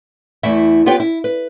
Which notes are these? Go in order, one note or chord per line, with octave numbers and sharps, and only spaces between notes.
E2 A3 E4 E5
B3 F4 G4 B4 C#5 G5
E4
B4